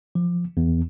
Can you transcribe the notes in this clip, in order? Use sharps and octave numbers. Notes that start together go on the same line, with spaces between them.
F3
E2